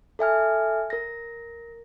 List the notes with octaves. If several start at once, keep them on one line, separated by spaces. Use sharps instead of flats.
A4 E5 G#5 F6
A#4 A#6